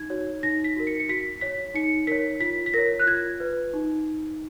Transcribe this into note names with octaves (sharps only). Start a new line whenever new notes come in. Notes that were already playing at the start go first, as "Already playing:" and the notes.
Already playing: D#4 G#6
F#4 C#5
D#4 A#6
B6
F#4 A#4
C#7
C#7
F#4 B6
C#5 B6
D#4 C#7
A#4 C#5 B6
F4 B6
B6
A#4 C#5 A#6
F#6
F4 G#6
B4
D#4